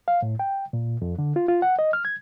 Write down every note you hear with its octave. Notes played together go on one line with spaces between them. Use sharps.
F5
A2
G5
A#2
F2
D3
F4
F4
F#5
D#5
F6
G#6